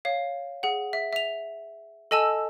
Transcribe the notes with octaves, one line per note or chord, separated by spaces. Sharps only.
C#5 F5
G#4 F#5
E5
E5 F7
A4 D#5 G#5 A5 E6